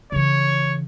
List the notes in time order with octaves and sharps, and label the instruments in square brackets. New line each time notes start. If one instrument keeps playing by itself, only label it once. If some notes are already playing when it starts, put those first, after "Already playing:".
[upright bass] C#3 E3 [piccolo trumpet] C#5